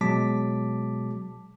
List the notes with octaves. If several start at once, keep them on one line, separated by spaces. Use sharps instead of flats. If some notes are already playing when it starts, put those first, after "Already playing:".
B2 F#3 G#3 A5 D6 B6